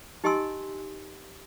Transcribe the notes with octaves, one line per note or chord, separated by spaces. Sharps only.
D#4 G4 D#5 G#5 C6 E6